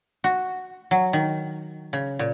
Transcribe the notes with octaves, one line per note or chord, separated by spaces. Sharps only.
F#4
F#3
D#3
C#3
A#2